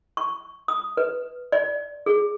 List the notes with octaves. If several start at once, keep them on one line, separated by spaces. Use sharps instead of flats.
C#6
D#6
B4
D5
G#4